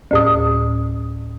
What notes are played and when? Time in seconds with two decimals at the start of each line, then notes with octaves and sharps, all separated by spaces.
0.11 D2 A2 D#6